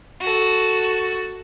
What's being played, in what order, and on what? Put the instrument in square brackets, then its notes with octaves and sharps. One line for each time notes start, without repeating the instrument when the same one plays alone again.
[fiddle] F#4 A4